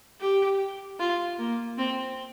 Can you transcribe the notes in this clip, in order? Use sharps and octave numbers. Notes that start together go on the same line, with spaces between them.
G4
F4
A#3
C4